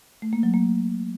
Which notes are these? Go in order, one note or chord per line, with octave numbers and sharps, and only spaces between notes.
A3
A#3
F#3
A#3